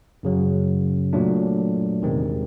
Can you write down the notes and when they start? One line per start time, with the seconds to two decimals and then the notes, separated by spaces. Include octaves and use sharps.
0.23 F#2 C#3 F#3
1.13 A#2 F#3 A3 D4
2.02 E2 C3 D#3 G#3 C4